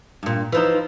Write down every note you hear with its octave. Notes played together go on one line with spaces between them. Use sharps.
G2 A#2
E3 F3 D#4